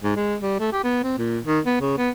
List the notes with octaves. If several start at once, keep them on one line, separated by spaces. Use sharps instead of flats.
G#2
G#3
G3
A3
G4
B3
C4
A#2
D#3
B3
C#3
B3